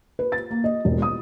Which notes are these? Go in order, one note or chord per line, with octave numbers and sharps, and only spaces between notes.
B4
A6
A#3
D#5
E1
D#6